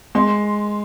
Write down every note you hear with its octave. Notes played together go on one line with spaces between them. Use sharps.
G#3 C6